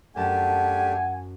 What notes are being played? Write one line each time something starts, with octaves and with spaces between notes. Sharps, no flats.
F#2 A3 D4 G4 F#5 G#5 A5